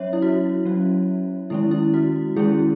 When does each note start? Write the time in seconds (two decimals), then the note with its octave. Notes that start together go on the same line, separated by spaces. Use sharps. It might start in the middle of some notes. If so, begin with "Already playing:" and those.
Already playing: F#3 C#4 C#5 E5
0.13 E4
0.22 F#4
0.65 F#3 C#4
1.50 D#3 G#3 C#4 E4
1.71 E4
1.94 F#4
2.36 D#3 G#3 C#4 E4 G#4